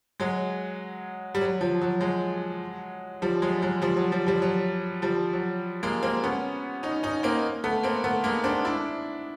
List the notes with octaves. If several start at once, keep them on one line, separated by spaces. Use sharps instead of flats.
F#3 G#3
G3
F#3
F3
F#3
F#3 G#3
F3 G3
F#3 G#3
F#3 G#3
F3 G3
F#3
F3 G3
F3 G3
F#3
F3 G3
F#3
G#3 A#3
A#3 C4
B3 C#4
C#4 D#4
C#4 D#4
A#3 C4
A3 B3
A#3 C4
A3 B3
G#3 A#3
C4 D4
D4 E4